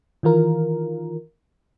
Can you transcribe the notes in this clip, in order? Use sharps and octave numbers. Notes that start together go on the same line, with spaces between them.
D#3 E3 F4 A#4